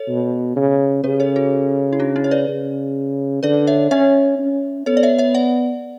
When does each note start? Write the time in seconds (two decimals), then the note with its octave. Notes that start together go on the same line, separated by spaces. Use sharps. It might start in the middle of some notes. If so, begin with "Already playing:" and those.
Already playing: A4 C#5
0.08 B2
0.56 C#3
1.04 C#3 G4 B4
1.20 A4 C#5
1.36 F#4 A4
1.93 E4
1.99 D4 F#4
2.16 C#4 E4
2.24 C#5
2.31 B4 D5
2.48 C#3
3.43 D3 B4 D5
3.67 C#5 E5
3.91 C#4 C#5 E5
4.39 C#4
4.86 B3 A4 C#5
4.97 D5
5.03 C#5 E5
5.18 C#5 E5
5.35 D5 F#5